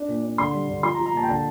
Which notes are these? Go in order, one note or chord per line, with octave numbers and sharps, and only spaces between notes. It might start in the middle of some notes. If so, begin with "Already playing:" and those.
Already playing: D4
A#2
D4
D3 C6
G3
D3
F3 C6
A#5
F3
A#5
A#2 A5
G5
D3 A5